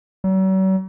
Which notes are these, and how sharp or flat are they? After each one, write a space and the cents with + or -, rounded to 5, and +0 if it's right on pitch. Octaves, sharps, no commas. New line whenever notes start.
F#3 +45